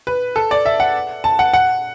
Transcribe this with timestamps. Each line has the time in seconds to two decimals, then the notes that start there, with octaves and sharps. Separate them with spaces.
0.07 B4
0.36 A4
0.51 D5
0.66 E5
0.80 F#5
1.24 A5
1.39 F#5
1.53 F#5